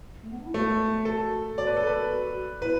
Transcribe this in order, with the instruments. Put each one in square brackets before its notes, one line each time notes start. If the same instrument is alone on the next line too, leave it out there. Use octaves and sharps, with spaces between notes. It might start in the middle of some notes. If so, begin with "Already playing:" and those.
[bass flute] A3
B3
D4
E4
[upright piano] A3 [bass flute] F#4
[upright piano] A4
[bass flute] F#4 [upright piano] D5
[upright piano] B4
A4
B4
[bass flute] E4 [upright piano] B4